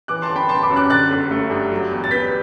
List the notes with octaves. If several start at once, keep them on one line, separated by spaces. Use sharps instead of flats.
E3 D6 F#6
A5 C6
G1
G5 B5
B3 A5 C6
B5 D6
F#2
D6 F#6
D3 F#6 A6
G1
A3
G2
F#3
E2
A6
B3 G6 B6